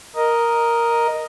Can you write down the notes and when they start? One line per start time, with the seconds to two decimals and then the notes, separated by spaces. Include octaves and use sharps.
0.16 A#4 D#5